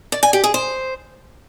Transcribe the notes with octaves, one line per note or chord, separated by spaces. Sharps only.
D5
G#5
G4
G#4
C5